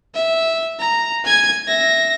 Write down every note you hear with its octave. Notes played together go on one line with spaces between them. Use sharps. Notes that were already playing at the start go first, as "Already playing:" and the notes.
E5
A#5
G#5 G#6
E5 A#6